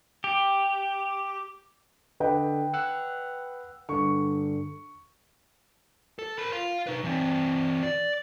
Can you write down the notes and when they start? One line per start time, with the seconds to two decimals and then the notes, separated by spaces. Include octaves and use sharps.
0.24 G4
2.20 D3 B4 D#5 G5
2.74 F#5 E6 F#6
3.89 G2 D3 C#6
6.19 A4
6.38 A#4 B5
6.52 F5 C6
6.87 D#4 B4
7.04 E3 C4
7.83 D5